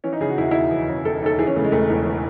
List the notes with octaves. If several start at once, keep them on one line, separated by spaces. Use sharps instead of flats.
E3 C#4
D#4
C#3 G#4
F#4
E1 E4
F#4
D#2 E4
E3
C#3
E1 A4
D#2 A4
E3 G#4
C#4
C#3 A3
G#3
E1 A3
E2
E3